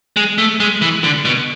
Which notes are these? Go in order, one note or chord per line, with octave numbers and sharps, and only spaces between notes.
G#3
A3
G#3
E3
D3
B2